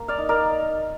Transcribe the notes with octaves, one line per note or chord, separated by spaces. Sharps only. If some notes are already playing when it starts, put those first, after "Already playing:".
Already playing: A#3
D5 F5
D#4
A#4 D5